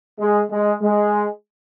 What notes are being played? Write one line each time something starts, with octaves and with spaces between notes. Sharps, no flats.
G#3
G#3
G#3